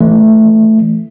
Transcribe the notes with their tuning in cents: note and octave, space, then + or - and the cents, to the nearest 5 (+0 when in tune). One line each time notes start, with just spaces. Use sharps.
E3 +15 A3 +0